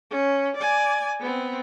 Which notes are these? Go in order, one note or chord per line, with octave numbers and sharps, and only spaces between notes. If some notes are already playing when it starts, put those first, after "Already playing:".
C#4
D5 G#5
B3 C4